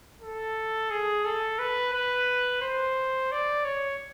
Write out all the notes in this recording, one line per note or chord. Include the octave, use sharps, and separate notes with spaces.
A4
G#4
A4
B4
B4
C5
D5
C#5